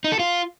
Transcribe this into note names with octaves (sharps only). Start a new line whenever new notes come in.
D#4
A4
F4